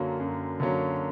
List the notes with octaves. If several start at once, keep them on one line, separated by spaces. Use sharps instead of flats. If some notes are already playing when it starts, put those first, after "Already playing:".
Already playing: F#2 D3 F#3 A#3 C#4
F#2
D3 F#3 A#3 C#4